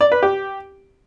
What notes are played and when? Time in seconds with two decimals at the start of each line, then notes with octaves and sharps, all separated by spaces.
0.01 D5
0.12 B4
0.23 G4